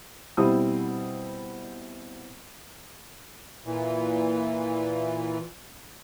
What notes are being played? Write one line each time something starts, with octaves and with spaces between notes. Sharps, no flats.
B2 G3 C4 E4 D#6 E6
A#2 E3